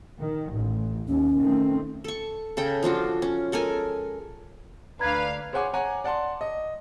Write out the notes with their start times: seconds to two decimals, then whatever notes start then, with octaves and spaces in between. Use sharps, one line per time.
0.19 D#3
0.52 A1
1.08 D#2 C#4
1.39 D#3 A3 C4
2.04 A4 C#6
2.57 C#3 A4 G5
2.83 F3 D4 F4 F#4
3.22 C#4
3.52 G#3 A4 A#4 G#5
5.00 D2 D4 B4 F5 A#5 G#6
5.53 G#4 C5 C#5 F#5 G#5 D6
5.74 C#5 F#5 G#5 A#5
6.04 D5 F#5 A5 C6
6.41 D#5